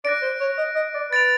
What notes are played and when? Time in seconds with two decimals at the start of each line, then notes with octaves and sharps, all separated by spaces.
0.05 D5 F#6 A#6 D7
0.22 C5
0.41 C#5
0.58 D#5
0.76 D#5
0.95 D5
1.11 B4 A6 D7 F7